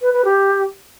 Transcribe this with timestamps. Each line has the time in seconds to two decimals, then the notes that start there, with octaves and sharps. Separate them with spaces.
0.02 B4
0.13 B4
0.25 G4